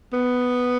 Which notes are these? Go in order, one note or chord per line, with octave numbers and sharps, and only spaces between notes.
B3